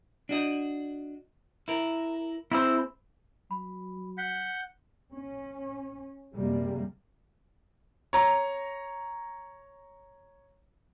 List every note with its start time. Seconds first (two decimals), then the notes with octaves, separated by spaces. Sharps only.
0.29 D4 F#4 D#5
1.68 E4 A#4
2.52 C4 E4 G#4 C5 B5 E6
3.51 F#3 B5
4.18 F#5 G6 B6
5.13 C#4
6.36 F#2 C3 G3 G#3 A#3
8.13 C#5 A#5